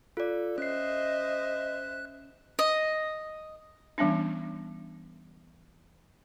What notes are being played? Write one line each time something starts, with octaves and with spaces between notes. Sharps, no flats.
F4 A4 D5
C#4 C5 D#5 E5 F#6 C7
D#5
E3 G3 B3 C#4 D4